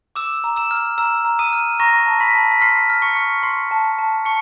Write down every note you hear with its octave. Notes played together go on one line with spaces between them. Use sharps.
D6 E6 E7
A#5
E6 E7
F6
A#5 E6 E7
A#5
D#6 D#7
F6
A#5 C#6 A#6
A5
B5 B6
A5
B6
C6 F6 C7
F6
C#6 C#7
F6
C6 C7
A5
A5
A5 C#6 C#7